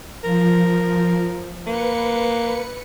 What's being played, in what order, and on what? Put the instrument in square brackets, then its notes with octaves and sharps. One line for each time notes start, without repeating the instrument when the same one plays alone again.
[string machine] F3 [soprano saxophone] A#4
[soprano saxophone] A#3 [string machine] B4 C#7